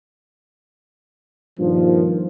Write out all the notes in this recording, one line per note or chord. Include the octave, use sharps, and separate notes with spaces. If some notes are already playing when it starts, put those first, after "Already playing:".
G2 A#2 D#3 F3